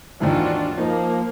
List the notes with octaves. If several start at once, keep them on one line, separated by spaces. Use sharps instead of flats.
D#2 G#2 E3 D4 F4 F#4
F3 A#3 D#4